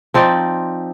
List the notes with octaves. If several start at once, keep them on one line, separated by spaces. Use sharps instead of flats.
F3 C4 D#4 D5